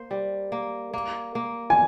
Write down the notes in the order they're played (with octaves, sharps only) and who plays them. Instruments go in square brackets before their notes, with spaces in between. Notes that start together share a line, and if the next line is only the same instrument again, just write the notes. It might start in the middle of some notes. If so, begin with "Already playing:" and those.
Already playing: [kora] A#3 C5
G3
A#3
A#3
A#3
[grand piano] G#5